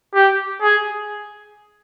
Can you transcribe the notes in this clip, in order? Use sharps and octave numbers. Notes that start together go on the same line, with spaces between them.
G4
G#4